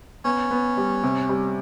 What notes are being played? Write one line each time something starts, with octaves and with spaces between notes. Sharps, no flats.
B3 C#4
B3
G3
C3
G3